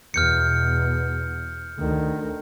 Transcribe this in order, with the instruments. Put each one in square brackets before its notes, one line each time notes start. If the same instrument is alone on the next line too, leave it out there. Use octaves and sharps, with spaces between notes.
[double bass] E2 B2 [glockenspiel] F6 G6 C#7
[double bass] D2 D#3